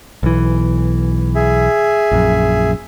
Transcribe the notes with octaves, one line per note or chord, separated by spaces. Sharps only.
B1 E3
G#4 E5
A#1 F#2